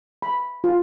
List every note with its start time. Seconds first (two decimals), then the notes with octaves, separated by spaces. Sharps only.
0.22 B5
0.64 F4